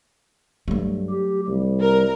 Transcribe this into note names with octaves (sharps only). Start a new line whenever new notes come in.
G2 F#3 A3
G4
C2 G3
A#4